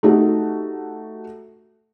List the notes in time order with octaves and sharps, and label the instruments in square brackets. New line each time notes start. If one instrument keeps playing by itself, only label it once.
[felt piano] A3 D#4 F#4 G4